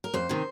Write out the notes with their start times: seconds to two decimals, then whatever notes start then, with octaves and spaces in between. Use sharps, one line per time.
0.04 A#4
0.14 F2 C5
0.29 C3 D#3